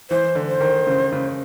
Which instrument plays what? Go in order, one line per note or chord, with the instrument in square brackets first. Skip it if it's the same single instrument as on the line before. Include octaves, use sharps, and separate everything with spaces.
[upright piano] E3 [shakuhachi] C5
[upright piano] D3
[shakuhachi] C5
[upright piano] D#3
C#3
C#3